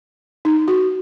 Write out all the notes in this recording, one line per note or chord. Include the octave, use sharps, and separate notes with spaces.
D#4
F#4